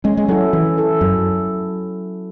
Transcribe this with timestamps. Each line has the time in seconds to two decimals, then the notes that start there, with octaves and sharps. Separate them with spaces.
0.04 G#3 C#4
0.17 G#3
0.28 F#3 E4 A4
0.53 E3 C#4
0.77 E4 A4
1.01 F#2 F#3